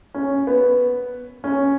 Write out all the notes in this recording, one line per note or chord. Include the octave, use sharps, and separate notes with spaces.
C#4
B3
C#4